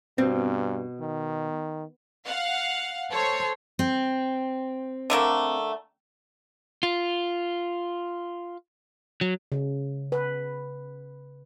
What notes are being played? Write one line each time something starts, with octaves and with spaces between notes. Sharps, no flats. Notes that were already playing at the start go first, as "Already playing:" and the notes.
G2 B2 C4
D#3
F5 F#5
A4 C5 C#5
C4
D3 A3 A#3
F4
F#3
C#3
B4